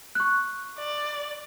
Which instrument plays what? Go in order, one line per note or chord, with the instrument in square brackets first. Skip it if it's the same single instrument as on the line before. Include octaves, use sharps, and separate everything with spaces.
[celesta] C#6 F#6
[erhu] D5